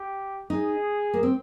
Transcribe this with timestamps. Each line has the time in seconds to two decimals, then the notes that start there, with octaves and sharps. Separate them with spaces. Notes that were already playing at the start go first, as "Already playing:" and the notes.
Already playing: G4
0.50 D#4 G#4
1.14 A#3
1.23 C4